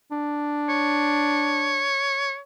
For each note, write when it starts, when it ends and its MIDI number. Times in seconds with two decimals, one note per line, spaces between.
0.12 1.89 62
0.69 2.39 73